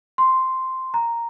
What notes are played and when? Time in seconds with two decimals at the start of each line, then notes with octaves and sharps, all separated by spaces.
0.18 C6
0.94 A#5